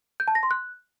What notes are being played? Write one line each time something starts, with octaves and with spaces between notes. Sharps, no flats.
G6
A5
A#6
C6
F#6